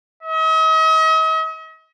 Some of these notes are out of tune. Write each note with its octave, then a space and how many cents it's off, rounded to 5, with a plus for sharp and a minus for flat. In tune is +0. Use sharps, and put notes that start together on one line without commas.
D#5 +45